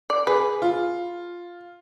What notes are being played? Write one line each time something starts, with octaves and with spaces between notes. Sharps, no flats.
D5
G#4 B4
F4